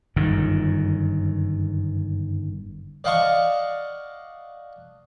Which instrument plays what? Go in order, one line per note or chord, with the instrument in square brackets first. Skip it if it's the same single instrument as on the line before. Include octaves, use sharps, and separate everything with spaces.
[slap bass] G1 F#2 D#3
[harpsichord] D5 D#5 F5 F#5 A5 C#6